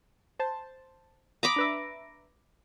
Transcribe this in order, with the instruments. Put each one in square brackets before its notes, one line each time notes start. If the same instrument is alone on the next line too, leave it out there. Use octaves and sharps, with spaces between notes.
[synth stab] C5 A5
[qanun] A#5 B5 D6 [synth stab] D#6
[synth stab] D4 B4 E5